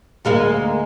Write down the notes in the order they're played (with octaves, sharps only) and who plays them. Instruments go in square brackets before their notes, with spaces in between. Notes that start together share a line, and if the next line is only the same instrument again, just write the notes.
[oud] D2 G#3 A#3